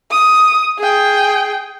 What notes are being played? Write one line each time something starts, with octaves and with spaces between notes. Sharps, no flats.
D#6
G#4 G5